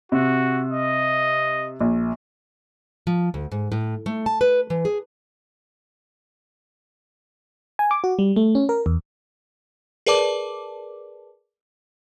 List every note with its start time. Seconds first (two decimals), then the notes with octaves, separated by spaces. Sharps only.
0.12 C3 F#4
0.72 D#5
1.80 A#1
3.07 F3
3.34 D2
3.52 G#2
3.72 A2
4.06 A3
4.26 A5
4.41 B4
4.70 E3
4.85 G#4
7.79 G#5
7.91 D6
8.04 F#4
8.19 G3
8.36 A3
8.55 C#4
8.69 A#4
8.86 E2
10.06 G#4 A#4 B4 D5 A5 D6